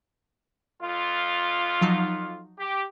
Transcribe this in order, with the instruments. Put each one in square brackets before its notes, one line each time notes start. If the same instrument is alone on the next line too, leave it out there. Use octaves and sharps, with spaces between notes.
[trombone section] F2 F4
[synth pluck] F3 F#3 D#4
[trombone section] G4